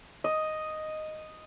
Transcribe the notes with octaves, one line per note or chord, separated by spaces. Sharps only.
D#5